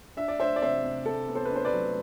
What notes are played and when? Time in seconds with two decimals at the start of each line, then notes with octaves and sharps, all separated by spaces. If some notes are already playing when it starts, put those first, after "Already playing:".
0.17 D4 E5
0.28 D5
0.39 D4 C5 E5
0.56 D5
0.61 C3 C5 E5
0.84 C3
1.06 C3 A4
1.28 B3
1.35 A4 C5
1.45 D4 B4
1.56 C5
1.65 B4 D5
1.73 F#3